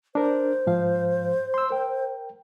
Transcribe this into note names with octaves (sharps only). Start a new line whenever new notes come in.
D4 A#4 C5
G#2 F3 F5
C6 E6
A#4 G5